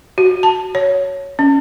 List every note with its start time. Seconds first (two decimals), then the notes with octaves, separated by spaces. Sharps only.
0.18 F#4
0.43 A5
0.75 C#5
1.39 C#4